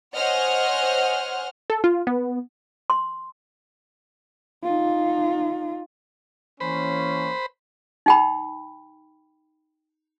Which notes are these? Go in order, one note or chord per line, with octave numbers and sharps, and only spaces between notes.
C5 C#5 D#5 F#5 G#5 F6
A4
F4
B3
C6
D#4 F4
E3 A#3 C#4 C5 B5
D#4 G5 B5